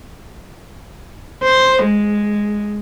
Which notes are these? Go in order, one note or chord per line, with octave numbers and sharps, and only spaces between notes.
C5
G#3